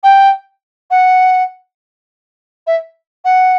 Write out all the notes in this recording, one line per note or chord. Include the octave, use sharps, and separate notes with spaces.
G5
F#5
E5
F#5